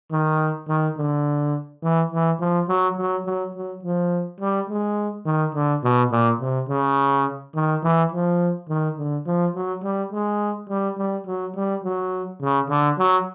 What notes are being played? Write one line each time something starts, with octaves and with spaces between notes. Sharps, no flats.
D#3
D#3
D3
E3
E3
F3
F#3
F#3
F#3
F#3
F3
G3
G#3
D#3
D3
B2
A#2
C3
C#3
D#3
E3
F3
D#3
D3
F3
F#3
G3
G#3
G3
G3
F#3
G3
F#3
C#3
D3
F#3